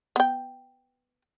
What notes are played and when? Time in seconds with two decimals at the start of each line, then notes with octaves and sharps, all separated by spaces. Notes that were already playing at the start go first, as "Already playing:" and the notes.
0.16 B3 G5